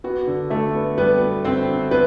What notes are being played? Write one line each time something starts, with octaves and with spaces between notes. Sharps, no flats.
B3 F#4
D3
D3 A3 A4
B3
G3 B3 B4
B3
D3 C4 C5
D3
D3 B3 B4